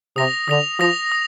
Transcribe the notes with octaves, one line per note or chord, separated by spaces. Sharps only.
C3 D#6 A#6 F7
D3 D#6 A#6 F7
F3 D#6 A#6 F7
D#6